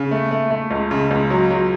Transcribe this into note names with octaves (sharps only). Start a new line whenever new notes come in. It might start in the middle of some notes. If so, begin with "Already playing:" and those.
Already playing: C#3
A3
A3
A3
C#2
C#3
C#2
F#3
F#3